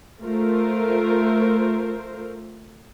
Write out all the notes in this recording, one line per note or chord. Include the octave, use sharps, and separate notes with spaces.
A3 F4 A#4 C5